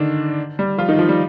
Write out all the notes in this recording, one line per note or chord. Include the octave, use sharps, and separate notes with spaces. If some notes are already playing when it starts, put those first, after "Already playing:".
Already playing: D3 D#3 D4
G3
F3 F4
D#3 D#4
F3
G3